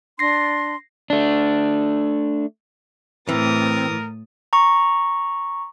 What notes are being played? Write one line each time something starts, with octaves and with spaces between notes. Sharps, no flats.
D4 C6 A#6 C7
A3 D4
A2 E3 C4 A#4 D#6 A6
A#5 C#6